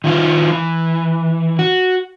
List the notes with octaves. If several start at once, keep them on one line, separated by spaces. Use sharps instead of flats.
D#3 E4 F4
E3
F#4